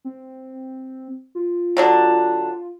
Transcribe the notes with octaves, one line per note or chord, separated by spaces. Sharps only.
C4
F4
D3 F#3 D4